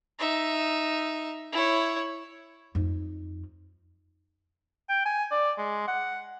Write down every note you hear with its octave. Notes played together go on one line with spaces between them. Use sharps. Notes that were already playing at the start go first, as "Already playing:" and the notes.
D#4 E5
E4 C#5
F2 D#4
G5
G#5
D5
G#3
F#5